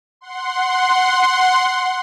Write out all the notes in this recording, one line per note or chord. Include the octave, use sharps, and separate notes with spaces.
F#5 C6